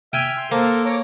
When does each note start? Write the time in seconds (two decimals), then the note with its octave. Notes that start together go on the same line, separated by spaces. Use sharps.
0.13 E5 G5 G#5 F6
0.37 C6
0.52 A#3 A4 A#4 C5
0.85 C#5 A#5 D6